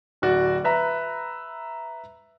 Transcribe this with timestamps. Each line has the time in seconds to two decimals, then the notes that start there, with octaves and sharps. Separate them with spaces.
0.22 D1 F#4 D5
0.64 B4 E5 A#5